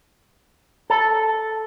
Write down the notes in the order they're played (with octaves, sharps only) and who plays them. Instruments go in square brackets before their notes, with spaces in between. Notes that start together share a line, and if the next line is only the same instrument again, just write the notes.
[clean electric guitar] A4